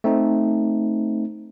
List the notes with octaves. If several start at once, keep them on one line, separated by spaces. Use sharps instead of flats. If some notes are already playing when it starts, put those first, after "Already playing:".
A3 C4 D#4